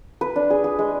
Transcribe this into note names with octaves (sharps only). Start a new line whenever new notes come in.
B4
D4
G#4
G#4
G#3